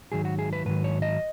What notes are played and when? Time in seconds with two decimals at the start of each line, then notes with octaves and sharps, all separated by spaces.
0.12 G#2 D#3 F#3 G#4
0.25 F#4
0.39 G#4
0.53 B4
0.65 G#2 D#3 F#3 B4
0.84 C#5
1.02 D#5